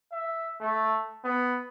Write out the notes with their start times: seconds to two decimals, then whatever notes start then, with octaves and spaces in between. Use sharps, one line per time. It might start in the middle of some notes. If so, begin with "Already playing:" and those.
0.12 E5
0.61 A3
1.25 B3